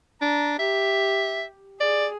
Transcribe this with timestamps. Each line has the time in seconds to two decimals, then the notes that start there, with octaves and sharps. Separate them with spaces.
0.21 D4 A#5
0.59 G4 E5
1.80 G#4 D5